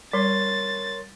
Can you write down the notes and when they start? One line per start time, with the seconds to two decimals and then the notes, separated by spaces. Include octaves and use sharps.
0.13 G3 A#4 C#5 C6 A6